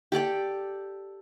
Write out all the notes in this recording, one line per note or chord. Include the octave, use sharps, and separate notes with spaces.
G4 A4 D5 G5